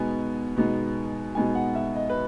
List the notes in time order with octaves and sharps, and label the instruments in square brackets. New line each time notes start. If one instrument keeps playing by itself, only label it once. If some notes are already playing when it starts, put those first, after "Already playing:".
Already playing: [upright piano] B2 G#3 B3 D#4 G#5
B2 G#3 B3 D#4
B2 G#3 B3 D#4 G#5
F#5
E5
D#5
B4